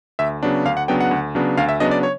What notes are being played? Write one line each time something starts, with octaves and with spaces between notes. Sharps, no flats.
D2 E5
C#3 F#3 B3 D4
D2 F5
F#5
C#3 F#3 B3 D4 G5
F#5
D2
C#3 F#3 B3 D4
D2 F5
E5
C#3 F#3 B3 D4 D#5
D5
C#5